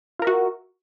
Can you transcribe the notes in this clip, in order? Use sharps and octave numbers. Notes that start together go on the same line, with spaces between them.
F4 F#4 A#4 E5